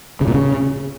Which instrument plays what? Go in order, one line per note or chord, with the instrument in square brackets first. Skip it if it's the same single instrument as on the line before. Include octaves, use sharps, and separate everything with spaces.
[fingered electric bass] C#3
A#2
C#3